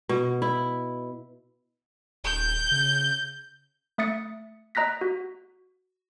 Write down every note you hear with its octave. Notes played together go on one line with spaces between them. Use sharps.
B2
E4
D#1 G6
C#3
A3 E5 D#6 A6 C#7
D#5 A#5 F#6 A#6 B6
F#4